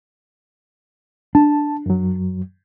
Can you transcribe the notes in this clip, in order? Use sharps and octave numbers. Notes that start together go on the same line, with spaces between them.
D4 A5
F#2 F#3